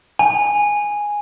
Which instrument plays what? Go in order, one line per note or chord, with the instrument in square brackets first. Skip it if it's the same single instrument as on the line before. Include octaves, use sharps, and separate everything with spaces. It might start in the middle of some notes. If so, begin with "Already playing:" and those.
[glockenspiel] G#5